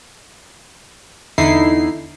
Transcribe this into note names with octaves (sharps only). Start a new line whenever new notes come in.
E2 D3 D#4 E4 C7